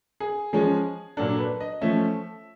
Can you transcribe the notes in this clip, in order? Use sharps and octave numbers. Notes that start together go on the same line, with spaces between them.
G#4
F3 G#3 C#4 G#4
A#2 F#3 A#3 D4 A4
B4
D#5
F3 A3 C#4 E5